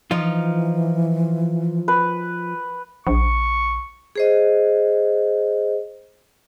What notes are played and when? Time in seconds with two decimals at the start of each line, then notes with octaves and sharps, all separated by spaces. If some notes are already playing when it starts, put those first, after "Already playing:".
0.11 E3 F3 D#4 F4
1.88 B4
3.07 A#1 C#6
4.16 G#4 C5 D#5